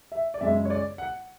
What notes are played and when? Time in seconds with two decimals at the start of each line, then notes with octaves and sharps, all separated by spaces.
0.12 E5
0.34 D5
0.41 F#2 C#3 G#3 E5
0.65 C#5
0.70 D5
0.98 F#5